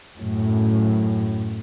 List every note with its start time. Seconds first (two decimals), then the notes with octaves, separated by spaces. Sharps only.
0.17 F#2 A2